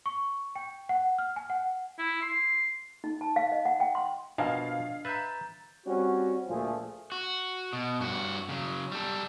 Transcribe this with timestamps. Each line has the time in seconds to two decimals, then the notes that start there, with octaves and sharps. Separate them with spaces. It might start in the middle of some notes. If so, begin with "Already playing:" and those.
0.06 C#6
0.56 G5
0.89 F#5
1.18 F6
1.36 G#5
1.50 F#5
1.98 E4
2.22 C6
3.04 D#4
3.21 A5
3.36 F5
3.52 D#5
3.65 F#5
3.80 G5
3.95 C6
4.38 B2 F3 D4 A#4 D#5 F5
5.05 B4 E5 A#5 G6 A6
5.87 G3 C4 C#4 F#4
6.48 D2 A#2 F3 A3 F4 G#4
7.12 F#4
7.73 B2
8.00 G2 F#4
8.49 C#3 F#3
8.92 G3 A4